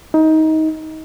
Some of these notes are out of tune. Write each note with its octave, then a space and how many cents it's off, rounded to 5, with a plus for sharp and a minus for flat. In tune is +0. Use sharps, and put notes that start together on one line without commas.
D#4 +20